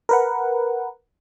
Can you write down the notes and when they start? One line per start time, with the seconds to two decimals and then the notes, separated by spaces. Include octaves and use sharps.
0.09 A#4 B4 F#5